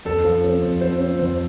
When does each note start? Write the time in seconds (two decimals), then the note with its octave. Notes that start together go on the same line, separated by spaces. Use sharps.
0.05 F2 A4
0.24 F3
0.44 C4
0.62 F2
0.81 F3 C5
1.00 C4
1.19 F2 C5